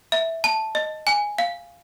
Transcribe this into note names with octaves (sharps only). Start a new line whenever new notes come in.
E5
A5
D#5
G#5
F5